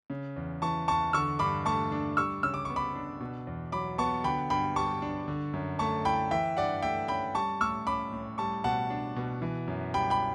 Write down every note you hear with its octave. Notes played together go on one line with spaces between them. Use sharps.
C#3
E2
E3 A5 C#6
E2 A5 C#6
D3 C#6 E6
G2 B5 D6
A3 A5 C#6
D4
G3 C#6 E6
C#3 E6
D6
B3 C#6
B5 D6
D4
B2
E2
F#3 B5 D6
B3 A5 C#6
D3 G5 B5
G2 G5 B5
G3 A5 C#6
D4
D3
F#2
A3 A5 C#6
E4 G5 B5
E3 E5 G5
G2 D5 F#5
A3 E5 G5
C#4 G5 B5
G3 A5 C#6
A2 C#6 E6
C#4 B5 D6
A2
G3 A5 C#6
B2 F#5 A5
D4
B2
E3
F#2
G3 G5 B5
G5 B5